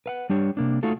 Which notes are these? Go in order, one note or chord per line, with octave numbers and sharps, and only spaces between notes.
B4 F5 F#5
G3 D4 G4 C#5
C3 A#3 D4
A3 D#4 F4 F#4 A4